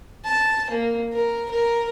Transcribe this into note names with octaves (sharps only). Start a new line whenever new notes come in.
A5
A#3
A#4
A#4